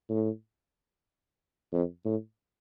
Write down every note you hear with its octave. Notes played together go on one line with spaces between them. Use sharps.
A2
F2
A2